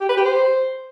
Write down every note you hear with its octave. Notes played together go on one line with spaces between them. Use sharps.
G4
B4
G4
C5